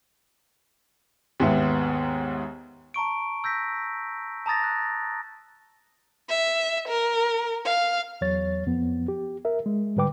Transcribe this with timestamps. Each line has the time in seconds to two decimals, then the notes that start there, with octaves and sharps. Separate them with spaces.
1.40 D#2 G#2 B3 E5
2.94 A5 A#5 C#6 D7
3.44 E6 G6 A#6 B6
4.46 A5 A#5 D#6 A6 A#6
4.64 F#6
6.29 E5
6.88 A#4
7.65 F5
8.21 E2 F#3 C#5 A6
8.66 F2 F3 B3
9.08 G4
9.45 A#4 E5
9.66 G#3
9.96 G#2 D3 G3 B4 G5 D6